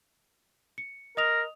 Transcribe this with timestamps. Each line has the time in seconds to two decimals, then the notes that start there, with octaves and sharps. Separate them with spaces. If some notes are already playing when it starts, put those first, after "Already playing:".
0.78 C#7
1.17 A#4 D#5 D#6 F7